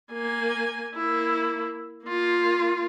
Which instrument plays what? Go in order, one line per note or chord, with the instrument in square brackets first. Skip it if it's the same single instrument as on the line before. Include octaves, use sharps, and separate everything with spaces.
[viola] A#3 G#5
A#3 E4
A#3 F4